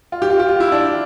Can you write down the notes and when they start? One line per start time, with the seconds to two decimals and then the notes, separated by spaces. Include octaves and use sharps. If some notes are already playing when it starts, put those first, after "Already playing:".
0.12 F4
0.22 G4
0.30 F4
0.39 G4
0.48 F4
0.60 E4
0.72 D4